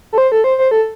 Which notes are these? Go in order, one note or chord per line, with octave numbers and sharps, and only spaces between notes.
A4
C5
A4
C5
C5
A4